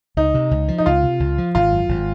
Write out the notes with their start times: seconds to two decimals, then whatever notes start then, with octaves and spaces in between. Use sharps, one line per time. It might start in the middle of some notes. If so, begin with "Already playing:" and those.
0.17 C#2 D#4
0.34 C3
0.51 C#2
0.68 F3
0.78 D#4
0.86 C#2 F4
1.03 C3
1.20 C#2
1.38 F3
1.55 G#1 F4
1.72 F#2
1.89 G#1